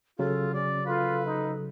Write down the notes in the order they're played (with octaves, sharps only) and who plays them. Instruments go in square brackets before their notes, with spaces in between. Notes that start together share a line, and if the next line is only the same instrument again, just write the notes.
[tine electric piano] C#3 F#3 [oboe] F4 [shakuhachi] A4
[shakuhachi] C#4 [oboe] D5
[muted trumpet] F4 [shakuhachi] A4 [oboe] B4
[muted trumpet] D#4